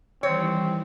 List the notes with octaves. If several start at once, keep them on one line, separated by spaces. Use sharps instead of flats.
D#3 E3 G3 C4 C#5